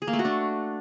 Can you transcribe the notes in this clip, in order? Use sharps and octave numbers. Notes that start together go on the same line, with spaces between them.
G#4
A#3
A3
F#4
D4